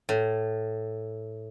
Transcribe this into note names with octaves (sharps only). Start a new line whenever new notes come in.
A2